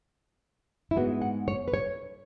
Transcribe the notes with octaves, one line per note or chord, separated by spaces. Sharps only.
E4
G#2 G#3 B3 F#4
F#5
C#5
B4
C#5